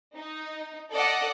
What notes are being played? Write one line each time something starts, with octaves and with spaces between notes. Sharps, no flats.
D#4
A4 D5 D#5 F#5